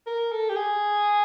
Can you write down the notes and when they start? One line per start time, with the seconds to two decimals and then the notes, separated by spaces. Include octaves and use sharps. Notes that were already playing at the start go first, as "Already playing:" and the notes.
0.07 A#4
0.32 A4
0.49 G4
0.56 G#4